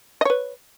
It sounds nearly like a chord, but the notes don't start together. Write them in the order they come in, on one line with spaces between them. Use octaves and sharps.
D#5 C#5 B4